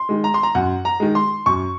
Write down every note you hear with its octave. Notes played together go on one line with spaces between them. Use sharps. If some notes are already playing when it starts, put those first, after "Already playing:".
Already playing: C6
D#3 G#3
A#5
C6
A#5
F#2 F#5
A#5
D#3 G#3
C6
F#2 C#6